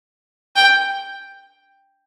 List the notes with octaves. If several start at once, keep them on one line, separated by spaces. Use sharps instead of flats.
G5